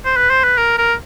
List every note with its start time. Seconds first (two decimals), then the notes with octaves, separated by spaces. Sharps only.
0.05 C5
0.17 B4
0.30 C5
0.44 B4
0.57 A#4
0.78 A#4